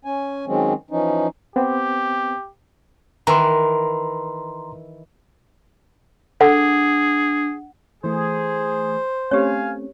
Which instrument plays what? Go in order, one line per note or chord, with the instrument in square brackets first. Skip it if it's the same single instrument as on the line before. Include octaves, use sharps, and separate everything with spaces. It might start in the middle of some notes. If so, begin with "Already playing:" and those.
[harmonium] C#4 G#5
D#3 F#3 G#3 C4 C#4
E3 F3 C#4 D#4
[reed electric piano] B3 C4 [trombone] G4
[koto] D#3 E3 [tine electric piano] A#5 C6
[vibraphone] D4 [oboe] G#4 [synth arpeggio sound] A4 [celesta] F#5
[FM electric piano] E3 A3 [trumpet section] G#4 [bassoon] C5
[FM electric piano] A3 C4 C#4 [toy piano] G4 C#5 [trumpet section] F5 G#5